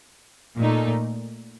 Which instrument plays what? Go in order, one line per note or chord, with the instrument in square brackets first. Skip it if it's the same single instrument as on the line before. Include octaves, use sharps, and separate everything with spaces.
[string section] A#2 A3 D#4